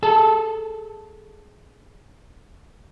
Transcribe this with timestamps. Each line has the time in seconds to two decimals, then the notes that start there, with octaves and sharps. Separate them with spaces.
0.03 G#4 A4 A5